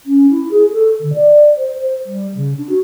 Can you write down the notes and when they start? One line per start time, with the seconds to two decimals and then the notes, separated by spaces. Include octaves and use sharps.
0.06 C#4
0.30 E4
0.51 G#4
0.72 A4
1.00 D3
1.14 D5
1.57 C5
1.80 C5
2.06 G3
2.34 C#3
2.58 D4
2.69 F#4